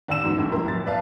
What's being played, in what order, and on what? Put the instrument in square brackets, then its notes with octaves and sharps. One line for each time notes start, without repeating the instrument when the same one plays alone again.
[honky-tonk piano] D#2 D5 F#5 E6 E7
G#2 B2 E3 F#3
F1 A#1 G2 A3 G4
E4 G4 A#4 C6
G1 F#2 A2 A6
B4 D5 E5 F5 A5